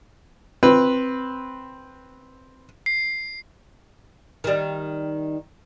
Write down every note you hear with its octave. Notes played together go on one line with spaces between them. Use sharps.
C4 B4
C7
D#3 G3